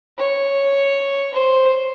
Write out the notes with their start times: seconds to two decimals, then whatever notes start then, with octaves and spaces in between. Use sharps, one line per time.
0.18 C#5
1.33 C5